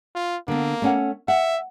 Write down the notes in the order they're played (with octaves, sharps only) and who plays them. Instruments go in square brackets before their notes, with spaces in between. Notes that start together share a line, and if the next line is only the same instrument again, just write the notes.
[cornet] F4
[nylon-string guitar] D3 B3 [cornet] A#3
[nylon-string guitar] A3 C#4 F#5
[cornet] E5 [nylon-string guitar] F#5